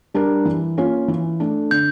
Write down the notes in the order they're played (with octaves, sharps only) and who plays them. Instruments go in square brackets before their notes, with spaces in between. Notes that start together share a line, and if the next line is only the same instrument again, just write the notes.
[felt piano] G3 D4 G4 A#4
E3
A#3 C#4 F4
E3
A3 D4
[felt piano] D3 [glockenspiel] G6